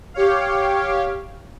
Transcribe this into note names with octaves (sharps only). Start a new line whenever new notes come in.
G4 C#5 F5